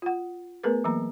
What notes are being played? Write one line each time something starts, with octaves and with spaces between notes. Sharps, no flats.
F4 F#5
A3 B3 G#4 A#4 B4
E3 F#3 A#3 A#5